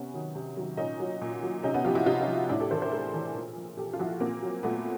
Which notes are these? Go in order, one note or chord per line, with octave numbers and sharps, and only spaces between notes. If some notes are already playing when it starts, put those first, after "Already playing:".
Already playing: C3 B3 C#4
D#3 F#3
C3
D#3 F#3
A#2 C#4 D#4
F#3
A#2
F#3
C3 C#4 D#4
B3 C#4
F3 F4 G4
E4 F#4
C3 D#4 F4
C#4 D#4
F3
A2 D4 E4
G4 A4
E3 A#4 C5
A#4 C5
A2 G#4 A#4
E3
A#2
F3
A#2 G4 A4
F4
F3 E4 F#4
A#2 A#3 C4
F#3
A#2 A3 B3